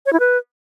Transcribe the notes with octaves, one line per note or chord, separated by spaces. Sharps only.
C#5
E4
B4